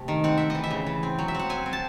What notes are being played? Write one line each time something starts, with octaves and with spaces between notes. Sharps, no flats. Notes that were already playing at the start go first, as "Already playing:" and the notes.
Already playing: C3 A3
D#3
C4 F#5
C4 E5
E3 D#5
E5
C#3
E3
C4
F#3
E5
C4 F#5
C4 G#5
C4
A5